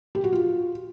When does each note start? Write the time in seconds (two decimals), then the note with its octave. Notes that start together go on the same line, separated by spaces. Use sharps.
0.15 G4
0.24 F#4
0.33 F4